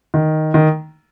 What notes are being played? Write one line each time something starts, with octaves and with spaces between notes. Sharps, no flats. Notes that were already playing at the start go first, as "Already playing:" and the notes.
D#3
D#3